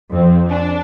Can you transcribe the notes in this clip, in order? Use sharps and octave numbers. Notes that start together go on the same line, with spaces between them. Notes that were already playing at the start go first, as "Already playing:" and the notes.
F2 C4
D4